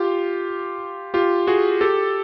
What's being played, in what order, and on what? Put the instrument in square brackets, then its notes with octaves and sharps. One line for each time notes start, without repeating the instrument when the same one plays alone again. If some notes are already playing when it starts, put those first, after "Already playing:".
Already playing: [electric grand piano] F4 G4
F4 G4
F#4 G#4
G4 A4